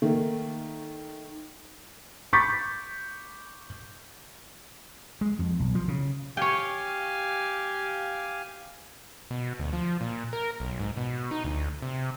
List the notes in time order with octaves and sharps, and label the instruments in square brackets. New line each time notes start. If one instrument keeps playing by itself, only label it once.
[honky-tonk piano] D#3 A3 A#3
[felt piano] B5 C#6 D6 G6 A6 B6
[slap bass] G#3
F2
B1
F3
C#3
[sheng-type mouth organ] G4 F5 G#5 [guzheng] C#5 G5
[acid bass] B2
D2
F3
A#2
A#4
B1
G#2
B2
D#4
D2
C3